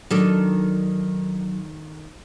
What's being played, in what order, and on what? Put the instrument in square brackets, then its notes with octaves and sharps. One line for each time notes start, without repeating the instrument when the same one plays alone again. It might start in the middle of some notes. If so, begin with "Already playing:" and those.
[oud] D#3 D4 A4 [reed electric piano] F#3